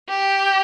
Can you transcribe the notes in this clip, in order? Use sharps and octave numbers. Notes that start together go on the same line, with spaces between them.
G4